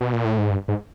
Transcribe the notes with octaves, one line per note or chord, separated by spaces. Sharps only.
B2
A#2
A2
G#2
G2
G#2